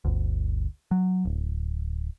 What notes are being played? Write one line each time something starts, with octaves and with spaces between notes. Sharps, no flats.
G1 D2
F#3
D1